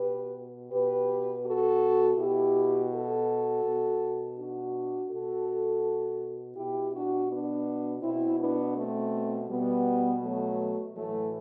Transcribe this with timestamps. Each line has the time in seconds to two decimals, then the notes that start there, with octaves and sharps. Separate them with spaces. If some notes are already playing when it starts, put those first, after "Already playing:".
Already playing: B2 G4 B4
0.71 B2 G4 B4
1.44 F#4 A4
2.17 B2 E4 G4
2.91 F#4 A4
3.64 B2
4.37 D4 F#4
5.10 B2 F#4 A4
6.56 B2 E4 G4
6.93 D4 F#4
7.29 B3 D4
8.02 B2 C4 E4
8.39 B3 D4
8.75 A3 C4
9.48 B2 G3 B3
10.22 F#3 A3
10.95 A2 E3 F#3 A3